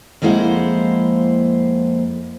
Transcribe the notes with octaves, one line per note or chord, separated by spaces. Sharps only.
F2 G#3 A#3 E4 C5 F#5